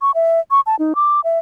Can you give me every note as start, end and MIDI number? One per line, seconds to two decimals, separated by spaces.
0.02 0.11 85
0.15 0.40 76
0.51 0.61 85
0.66 0.76 81
0.79 0.93 63
0.95 1.20 86
1.24 1.39 76